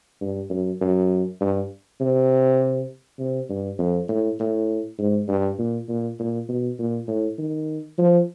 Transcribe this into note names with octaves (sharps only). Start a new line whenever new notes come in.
G2
F#2
F#2
G2
C3
C3
G2
F2
A2
A2
G#2
G2
A#2
A#2
A#2
B2
A#2
A2
D#3
F3